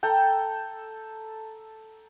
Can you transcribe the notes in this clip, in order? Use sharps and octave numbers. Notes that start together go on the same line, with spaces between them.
A4 G5 A#5